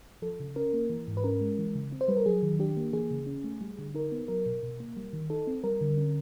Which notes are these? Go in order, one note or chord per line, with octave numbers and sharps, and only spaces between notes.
F3 A4
C#3
C#4 A#4
A#3
E3
G#2
B4
C#4 A#4
G#3
E3
C#3
C4
C5
G3 B4
A#4
F#3 G#4
D#3
D4 G4
A#3
E3 G#4
C#3
C#4
A3
G3
D3
D#4 A#4
B3
F#3 A#4
B2
B2
A#3
G3
D#3
D#4 A4
C4
G3 A#4
D3
C#4